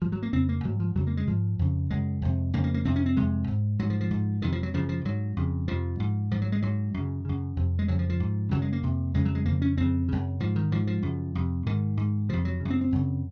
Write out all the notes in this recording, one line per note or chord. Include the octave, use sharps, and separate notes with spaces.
G#2 F3
F#3
A#3
F2 C#3 C4
A#3
G#2 F#3
F3
F2 C#3 F#3
A#3
G#3
G#2 F3
F2 C#3
F#2 C#3 G#3
F2 C3
F2 C#3 A#3
A#3
A#3
F2 C3 C4
C#4
C4
F2 C3 G#3
G#2
G#2 F#3
F3
F3
G#2
F2 C3 D#3
F3
F#3
F#2 C#3 F3
F3
G#2 F#3
F2 C#3
F2 C3 F3
G#2
G#2 F3
F#3
G#3
G#2 F#3
F#2 C#3
F#2 C#3
F2 C3
G#3
F2 C#3 F#3
F3
F3
G#2
F#2 C#3 F#3
G#3
A#3
F2 C3
F2 C#3 G#3
F#3
G#3
F2 C#3 A#3
C#4
F2 C#3 C4
F#2 C#3
G#2 F3
D#3
G#2 F3
F3
F#2 C#3
F2 C3
G#2 D#3
G#2
F2 C3 F3
F#3
F#2 C#3
C4
C4
F#2 C#3